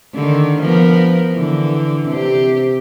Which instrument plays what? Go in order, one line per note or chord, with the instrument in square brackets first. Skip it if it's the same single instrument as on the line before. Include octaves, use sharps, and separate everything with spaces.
[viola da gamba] D3 D#3
F3 B3 A#4
D3 E3
C3 C4 G4